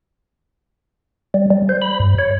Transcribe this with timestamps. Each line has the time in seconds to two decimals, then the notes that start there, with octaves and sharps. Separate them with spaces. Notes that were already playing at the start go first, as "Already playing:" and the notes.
1.34 G3
1.50 G3
1.69 C5
1.82 B5
2.00 G2
2.18 C#5